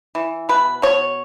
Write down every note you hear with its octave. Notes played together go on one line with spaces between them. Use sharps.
E3
B2 B4
B2 C#5